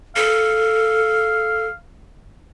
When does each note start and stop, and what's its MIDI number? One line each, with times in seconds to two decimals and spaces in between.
0.16 1.67 69
0.16 1.76 77